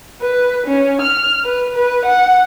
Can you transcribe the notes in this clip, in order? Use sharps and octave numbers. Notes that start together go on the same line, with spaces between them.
B4
C#4
F6
B4
B4
F#5